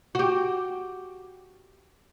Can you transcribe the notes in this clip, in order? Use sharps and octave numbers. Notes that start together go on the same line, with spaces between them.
F#4 G4